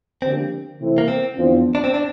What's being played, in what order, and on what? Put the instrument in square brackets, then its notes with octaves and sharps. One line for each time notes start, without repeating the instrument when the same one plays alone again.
[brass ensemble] D3 F3 A#3 D4 G4 [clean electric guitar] C4
[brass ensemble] C3 E3 A3 C4 E4
[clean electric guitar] A#3
C4
[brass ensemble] E2 D3 F3 C4
[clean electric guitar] D4
C4
D4